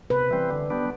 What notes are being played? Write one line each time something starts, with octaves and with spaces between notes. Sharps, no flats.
C3 B4
E3 G3 C4
D3
G3 B3 D4